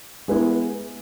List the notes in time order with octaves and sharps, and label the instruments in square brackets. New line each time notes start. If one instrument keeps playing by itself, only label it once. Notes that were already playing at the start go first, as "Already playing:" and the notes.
[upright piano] G#3 B3 E4